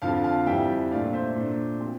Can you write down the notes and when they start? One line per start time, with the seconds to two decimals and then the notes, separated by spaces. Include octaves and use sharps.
0.02 F2 D3 F3 F5 A5
0.24 F5 A5
0.46 F2 E3 G3 E5 G5
0.91 A#2 A3 D4 D5 F5
1.13 C5 E5
1.36 A#2 A3 D4
1.80 F3 C4